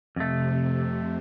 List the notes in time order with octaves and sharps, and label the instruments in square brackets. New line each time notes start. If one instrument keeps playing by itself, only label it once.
[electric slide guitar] F2 A3 [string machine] C3